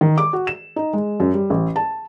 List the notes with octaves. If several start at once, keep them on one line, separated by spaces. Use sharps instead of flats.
D#3
D6
F#4
E7
D#4
G#3
F#2
G3
A1
A5